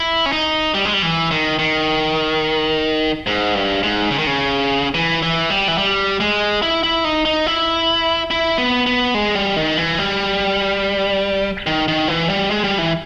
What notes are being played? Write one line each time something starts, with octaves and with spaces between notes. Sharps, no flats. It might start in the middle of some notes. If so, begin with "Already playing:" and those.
Already playing: E4
C#4
D#4
G3
G#3
G3
E3
D#3
D#3
G#2
G2
G#2
C#3
D#3
C#3
E3
E3
G3
E3
G3
G#3
E4
E4
D#4
D#4
E4
E4
B3
B3
G#3
G3
D#3
E3
G3
D#3
D#3
E3
G3
G#3
G3
E3